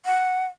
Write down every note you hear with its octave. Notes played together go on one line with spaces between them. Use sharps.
F#5